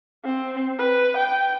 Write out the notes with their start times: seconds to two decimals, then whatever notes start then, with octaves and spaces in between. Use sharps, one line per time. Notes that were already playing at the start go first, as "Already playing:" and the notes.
0.25 C4
0.78 B4
1.17 G5